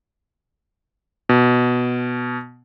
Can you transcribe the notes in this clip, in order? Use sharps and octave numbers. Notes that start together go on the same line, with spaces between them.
B2